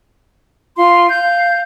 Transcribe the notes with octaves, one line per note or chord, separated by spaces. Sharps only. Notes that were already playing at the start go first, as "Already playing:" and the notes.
F4 C6
F5 G6